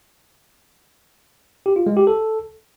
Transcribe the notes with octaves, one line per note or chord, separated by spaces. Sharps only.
G4
F4
G#3
G4
A4